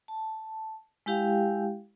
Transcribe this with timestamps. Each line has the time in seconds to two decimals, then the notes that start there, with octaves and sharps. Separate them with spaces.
0.08 A5
1.06 G#3 E4 G4 F5 G5